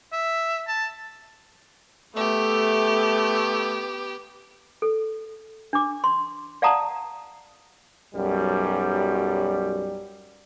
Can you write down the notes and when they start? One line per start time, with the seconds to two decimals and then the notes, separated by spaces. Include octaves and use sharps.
0.13 E5
0.68 A5
2.15 A3 B3 G4
4.82 A4
5.73 D4 D6
6.04 C6
6.62 D5 F5 F#5 A5 A#5 D#6
8.15 B1 F#2 G3